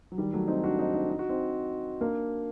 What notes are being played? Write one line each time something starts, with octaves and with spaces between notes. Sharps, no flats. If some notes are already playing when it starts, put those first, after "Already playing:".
F#3
D#3 G3
F#3 A3
C4 D#4
D4 F#4
C4 D#4
C4 D#4
D#4
F#4
C4 D#4
A#3 D4